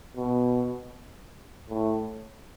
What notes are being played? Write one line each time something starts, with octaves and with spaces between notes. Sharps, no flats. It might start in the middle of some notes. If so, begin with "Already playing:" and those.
B2
A2